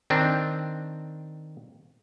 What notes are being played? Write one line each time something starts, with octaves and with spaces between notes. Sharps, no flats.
D#3 C4 D4